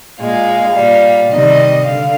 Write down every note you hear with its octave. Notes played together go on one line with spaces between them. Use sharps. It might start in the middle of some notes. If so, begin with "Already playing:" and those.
A#2 G#3 F5
A#2 G3
C3 D#3 G3 D#5
D3 F5